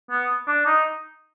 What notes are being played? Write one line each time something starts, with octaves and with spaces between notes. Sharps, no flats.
B3
D4
D#4